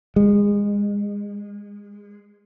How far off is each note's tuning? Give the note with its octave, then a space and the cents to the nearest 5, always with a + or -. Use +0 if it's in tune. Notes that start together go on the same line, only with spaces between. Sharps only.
G#3 -25